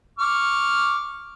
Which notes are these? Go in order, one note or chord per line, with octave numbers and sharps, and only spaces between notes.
C#6 D6 F6